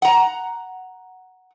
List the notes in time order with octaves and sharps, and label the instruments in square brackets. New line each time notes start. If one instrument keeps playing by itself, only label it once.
[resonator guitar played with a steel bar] F#5 A#5